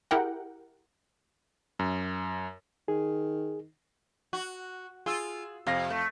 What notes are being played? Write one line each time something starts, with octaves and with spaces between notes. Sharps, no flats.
E4 G4 G#4 A#4 F#5 G5
F#2
D#3 G#4
F#4
F4 G#4 E6
F2 C3 F5 A#6
A3